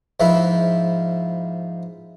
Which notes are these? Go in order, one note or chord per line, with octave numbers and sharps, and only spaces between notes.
G#2 F3 E4 F4 B4 E5